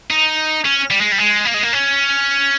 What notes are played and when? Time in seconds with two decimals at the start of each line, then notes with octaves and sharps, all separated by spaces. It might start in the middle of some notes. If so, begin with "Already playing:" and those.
0.10 D#4
0.65 C#4
0.90 G3
1.01 G#3
1.12 G3
1.18 G#3
1.45 A#3
1.54 G#3
1.63 A#3
1.73 C#4